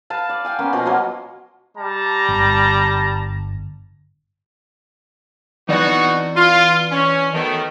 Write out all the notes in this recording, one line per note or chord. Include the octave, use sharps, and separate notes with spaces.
B4 F5 A5
D5
F5 G5 G#5
A#3 B3 C#4
B2 F3 D#5
F#3 A#3 F#4 C5
G3 A5 A#5
G1
B2 E3 D#4 F#4 D5
F4
C#4
B2 D#3 A3